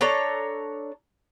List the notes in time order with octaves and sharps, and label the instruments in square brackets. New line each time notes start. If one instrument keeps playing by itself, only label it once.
[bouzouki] D4 A4 C#5 A#5